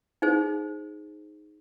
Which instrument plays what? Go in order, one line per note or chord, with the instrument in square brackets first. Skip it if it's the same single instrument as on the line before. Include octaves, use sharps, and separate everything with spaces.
[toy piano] D#4 G#4 C5